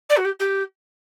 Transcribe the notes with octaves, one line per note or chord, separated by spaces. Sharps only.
D5
F#4
G4
G4